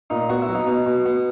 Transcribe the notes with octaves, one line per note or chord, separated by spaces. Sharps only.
A#2 D#4
B3 F#4
E4
F#3
D#4
B2
B2
B3